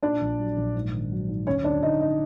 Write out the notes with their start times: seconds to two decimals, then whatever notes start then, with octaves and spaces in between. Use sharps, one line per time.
0.03 A#2 D4 D5
0.21 A#1
0.39 F#3
0.57 A#1
0.75 G#2
0.93 D#3
1.11 F#3
1.29 G#2
1.47 D2 C#4 C#5
1.64 D2 D4 D5
1.83 D2 D#4 D#5
2.01 D#4 D#5